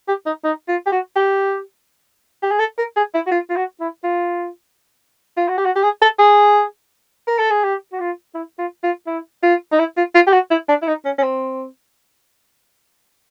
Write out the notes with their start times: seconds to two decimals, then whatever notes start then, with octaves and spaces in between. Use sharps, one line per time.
0.08 G4
0.26 D#4
0.44 D#4
0.68 F4
0.86 G4
0.92 F#4
1.16 G4
2.43 G4
2.51 G#4
2.59 A4
2.78 A#4
2.96 G#4
3.14 E4
3.27 F#4
3.31 F4
3.50 F4
3.56 F#4
3.80 E4
4.04 F4
5.37 F4
5.48 F#4
5.58 G4
5.65 F#4
5.76 G4
5.83 G#4
6.02 A4
6.19 G#4
7.28 A#4
7.39 A4
7.51 G#4
7.64 G4
7.93 F#4
8.00 F4
8.35 E4
8.59 F4
8.83 F4
9.07 E4
9.43 F4
9.72 D#4
9.79 E4
9.97 F4
10.15 F4
10.27 G4
10.33 F#4
10.51 E4
10.69 D4
10.82 E4
10.88 D#4
11.05 C#4
11.18 C#4
11.23 C4